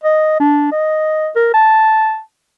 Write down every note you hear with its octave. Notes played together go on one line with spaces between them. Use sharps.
D#5
D4
D#5
A#4
A5